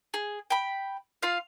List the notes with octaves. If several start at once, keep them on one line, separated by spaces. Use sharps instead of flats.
G#4
G5 B5
F4 F5